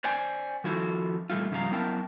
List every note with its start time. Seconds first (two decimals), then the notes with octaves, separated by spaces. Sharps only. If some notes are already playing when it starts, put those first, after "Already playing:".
0.04 C5 D5 G5 G#5
0.64 D#3 F3 E4 F#4 A4
1.30 A#2 E3 G3 A3 F4
1.51 G#2 C#3 F3 G3 F5 A#5
1.70 F#2 B3 E4 A#4 G5 A5